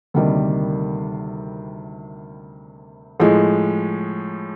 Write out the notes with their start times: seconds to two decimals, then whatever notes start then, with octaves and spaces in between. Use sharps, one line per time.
0.14 D2 C3 D#3 G3 A#3
3.20 A2 F3 G#3